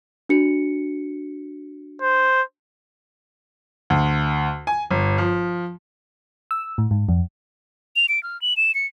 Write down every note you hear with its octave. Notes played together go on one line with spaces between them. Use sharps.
D4 F#4 C#7
C5
D2
G#5
G1
F3
E6
A2
G#2
F2
F7
D7
F6
F#7
E7
C#7